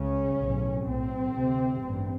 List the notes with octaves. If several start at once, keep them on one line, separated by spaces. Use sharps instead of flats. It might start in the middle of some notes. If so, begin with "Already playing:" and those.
Already playing: C#2 C#3 C#4
B1 A2
B1 A2 C4
D2 C3
A1 G2